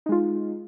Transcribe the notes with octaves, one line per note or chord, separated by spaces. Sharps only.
G#3 D#4 F4